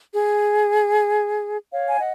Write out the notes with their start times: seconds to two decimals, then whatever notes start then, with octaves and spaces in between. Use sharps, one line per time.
0.13 G#4
1.73 C#5 F5
1.89 G#5
1.99 D#5 F#5